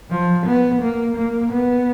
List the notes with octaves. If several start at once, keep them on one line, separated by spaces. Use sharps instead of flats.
F3
B3
A#3
A#3
B3